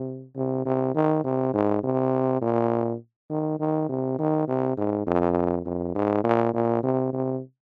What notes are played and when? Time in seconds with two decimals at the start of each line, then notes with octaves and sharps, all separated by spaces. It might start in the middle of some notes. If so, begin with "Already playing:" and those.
Already playing: C3
0.36 C3
0.65 C3
0.95 D#3
1.24 C3
1.54 G#2
1.83 C3
2.41 A#2
3.30 D#3
3.60 D#3
3.89 C3
4.19 D#3
4.48 C3
4.77 G#2
5.07 F2
5.66 F2
5.95 G#2
6.24 A#2
6.54 A#2
6.83 C3
7.13 C3